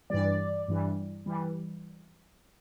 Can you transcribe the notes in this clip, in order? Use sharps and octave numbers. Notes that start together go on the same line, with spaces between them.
G2 E3 G3 D5
G2 E3 G3
E3 G3